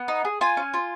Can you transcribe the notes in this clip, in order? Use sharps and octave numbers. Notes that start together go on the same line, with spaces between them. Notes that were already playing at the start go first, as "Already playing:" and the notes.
Already playing: B3
D#4
G#4
F4 G#5
C#4
F4